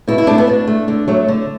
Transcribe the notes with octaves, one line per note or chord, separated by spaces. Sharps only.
B2 E4
E4
A3 D4
B3
B2 D4
A3
D3
F#3 A3
D3